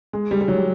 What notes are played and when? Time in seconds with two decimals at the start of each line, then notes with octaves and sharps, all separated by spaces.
0.13 G#3
0.31 G3
0.41 G3
0.48 F#3